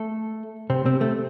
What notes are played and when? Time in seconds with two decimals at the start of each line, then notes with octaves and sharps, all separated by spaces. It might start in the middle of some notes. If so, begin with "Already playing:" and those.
Already playing: A3 A4
0.70 C3 C4
0.86 C3 C4
1.01 A3